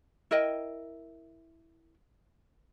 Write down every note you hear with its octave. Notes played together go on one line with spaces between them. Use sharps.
E4 A#4 D#5 G5